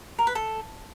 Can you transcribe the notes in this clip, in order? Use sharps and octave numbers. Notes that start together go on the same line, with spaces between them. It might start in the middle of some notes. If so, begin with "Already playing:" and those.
A#4
B4
A4